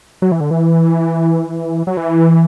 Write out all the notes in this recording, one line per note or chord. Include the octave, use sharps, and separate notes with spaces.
F#3
E3
D3
E3
F#3
E3